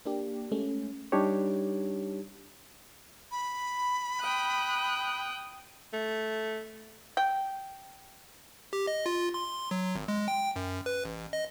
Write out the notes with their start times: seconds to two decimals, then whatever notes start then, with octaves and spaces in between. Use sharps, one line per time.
0.05 A#3 D4 G4
0.52 G#3 A3 C#4
1.12 G3 D4 D#4 G4 C#5
3.31 B5
4.20 G5 D#6 F#6
5.93 A3
7.17 G5
8.73 G4
8.87 D#5
9.06 F4
9.34 C6
9.71 F#3
9.95 G#1
10.08 G#3
10.28 G5
10.56 F#2
10.86 B4
11.05 A1
11.33 D#5